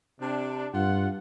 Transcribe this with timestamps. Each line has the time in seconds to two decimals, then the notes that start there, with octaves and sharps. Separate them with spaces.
0.21 C3 D4
0.74 G2 F4 F#5